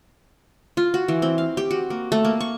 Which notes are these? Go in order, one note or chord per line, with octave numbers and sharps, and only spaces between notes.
F4
F#4
E3
C4
F5
G4
F#4
A#3
A3
A#3
C#6